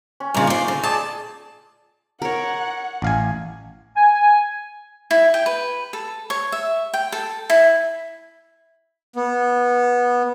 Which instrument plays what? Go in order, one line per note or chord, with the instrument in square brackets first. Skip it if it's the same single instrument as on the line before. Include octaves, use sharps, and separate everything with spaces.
[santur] C#4
[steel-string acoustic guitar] G2 C#3 [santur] A#3 D#4 F4
[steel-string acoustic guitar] D4 C5 [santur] C#5 C#6
[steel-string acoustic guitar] D3
[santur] G#4 D5 G#5 [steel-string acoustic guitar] A5
[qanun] A#4 C#5 [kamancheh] F#5
[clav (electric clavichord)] A1 F5 G#5
[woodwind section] G#5
[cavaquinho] E4
G5
B4
A4
C#5
E5
G5
A4
E4
[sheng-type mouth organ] B3